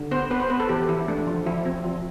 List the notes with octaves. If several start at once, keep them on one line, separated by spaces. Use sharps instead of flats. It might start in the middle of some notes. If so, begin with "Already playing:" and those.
Already playing: D3
B3 C5
B3 B4
C5
B3 B4
A4
E3 G4
E3 E4
A3 D4
F3
F3 E4
C4
F3